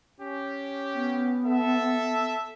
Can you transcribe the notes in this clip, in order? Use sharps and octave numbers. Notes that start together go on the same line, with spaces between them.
C#4 G4
B3
A4 E5